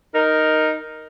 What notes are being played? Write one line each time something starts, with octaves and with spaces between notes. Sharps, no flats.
D#4 A#4